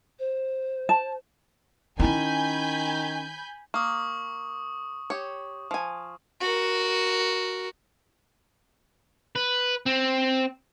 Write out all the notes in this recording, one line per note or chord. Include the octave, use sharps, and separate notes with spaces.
C5
A5
D#3 C#4 E4 G#5 B5 G6
A#3 C#6 D#6
G4 C#5
F3 G#5
F#4 A#4
B4
C4